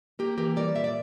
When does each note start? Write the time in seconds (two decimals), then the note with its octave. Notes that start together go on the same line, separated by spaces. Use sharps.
0.19 A#3 G4 A#4
0.38 E3 G4 A#4
0.56 G3 A#4 D5
0.75 A#2 E5
0.84 D5